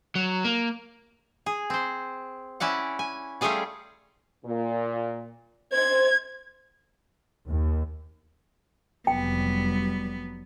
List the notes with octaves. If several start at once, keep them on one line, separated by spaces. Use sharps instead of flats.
F#3
A#3
G#4
C4 C5
C#4 E4 D5 F#5
G#5
G3 A3 C#4 F4 G#4 D5
A#2
C5 G#6
D#2
F1 F#3 G3 B3 G5